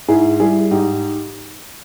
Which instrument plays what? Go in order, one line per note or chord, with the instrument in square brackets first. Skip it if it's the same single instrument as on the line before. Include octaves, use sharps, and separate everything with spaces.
[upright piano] G#2 E4 G#4
G3 E4 G#4
G#2 D#4 G4